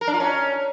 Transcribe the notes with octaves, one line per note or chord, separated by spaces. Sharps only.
A#4
D4
F4
C#4